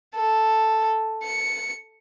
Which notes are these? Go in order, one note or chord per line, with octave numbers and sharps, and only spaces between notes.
A4
C#7